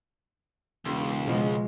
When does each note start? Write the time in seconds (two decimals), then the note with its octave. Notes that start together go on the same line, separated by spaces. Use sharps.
0.85 E1 C#2
1.27 B2 F3 G#3